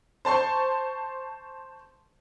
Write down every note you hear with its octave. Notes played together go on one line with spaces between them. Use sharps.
C5 A5 C6 C#6